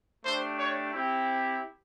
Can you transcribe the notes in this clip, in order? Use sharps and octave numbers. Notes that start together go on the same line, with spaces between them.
A3 D4 G4 C5
C#5
C4 E4 G4